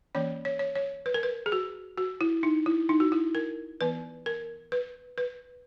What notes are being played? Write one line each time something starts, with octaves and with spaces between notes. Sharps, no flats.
E3 A#3 C#4 C#5
C#5
C#5
C#5
B4
A#4
B4
G#4
F#4
F#4
E4
D#4
E4
D#4
F#4
E4
A#4
E3 B3 B4
A#4
B4
B4